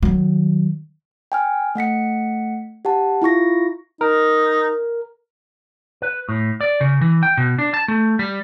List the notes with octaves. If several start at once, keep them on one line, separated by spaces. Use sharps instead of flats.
D#3 F#3
G5 G#5 F6
A3 F#5 B6 C#7
G4 F#5 A5
E4 F4 C#6 A#6
D#4 A#4
B4
A2
D5
C#3
E3
G5
B2
D4
A5
A3
G3